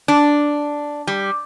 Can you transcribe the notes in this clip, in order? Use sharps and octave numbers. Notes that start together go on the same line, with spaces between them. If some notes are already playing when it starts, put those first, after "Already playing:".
D4
G3